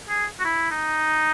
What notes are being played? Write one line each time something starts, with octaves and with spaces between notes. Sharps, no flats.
G#4
F#4
E4
D#4